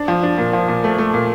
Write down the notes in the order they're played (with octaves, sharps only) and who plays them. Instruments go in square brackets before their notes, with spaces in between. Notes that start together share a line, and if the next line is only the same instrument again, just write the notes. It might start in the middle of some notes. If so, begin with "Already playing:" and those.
Already playing: [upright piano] D4
F3
D4
A#2
F3
A#2
A3
A3
A#2